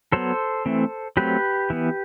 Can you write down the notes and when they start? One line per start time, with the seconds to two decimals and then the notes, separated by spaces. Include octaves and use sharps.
0.12 F#3 B3 A4 C5
0.66 E3 A3 C4
1.17 F#3 A3 C4 G4 B4
1.70 E3 B3